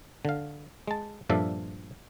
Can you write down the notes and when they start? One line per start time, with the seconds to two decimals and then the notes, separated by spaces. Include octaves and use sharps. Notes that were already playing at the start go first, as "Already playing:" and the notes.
0.25 D3 F5
0.88 G#3 A5
1.29 G2 A#2 F3 D4 A4 E5